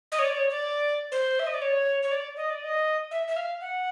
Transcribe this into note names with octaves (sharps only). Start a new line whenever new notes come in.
D#5
C#5
D5
C#5
D5
C5
E5
D#5
D5
C#5
C#5
D5
D#5
D5
D#5
E5
E5
F5
F#5